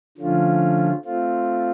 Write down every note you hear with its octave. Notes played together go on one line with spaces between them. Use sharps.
D3 F3 A3 C#4 F4
A3 C4 F4